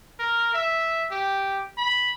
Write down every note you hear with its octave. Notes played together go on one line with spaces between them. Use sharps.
A#4
E5
G4
B5